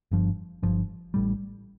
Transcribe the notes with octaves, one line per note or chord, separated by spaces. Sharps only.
G1 G2 F3
G1 G2 F3
A1 A2 G3